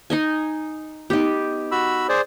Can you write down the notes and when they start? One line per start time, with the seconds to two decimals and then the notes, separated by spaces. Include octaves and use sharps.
0.10 D#4 D#5 G#5
1.10 B3 D#4 G4
1.72 F#4 B5 E6
2.09 G#4 C5 D5